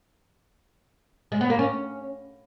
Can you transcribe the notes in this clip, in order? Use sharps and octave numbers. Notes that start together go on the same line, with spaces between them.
G#3
B3
A#3
C#4